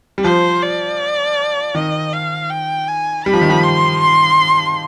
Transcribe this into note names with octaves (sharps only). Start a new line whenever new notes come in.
G3
F3 C5
D5
D#3 D#5
F5
G5
G#5
G3 B5
F3
D#3
F3
C6
C6